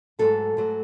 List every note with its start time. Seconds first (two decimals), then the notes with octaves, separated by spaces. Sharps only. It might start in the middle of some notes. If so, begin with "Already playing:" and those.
0.19 G#2 F#3 A3 A4
0.57 G#2 F#3 A3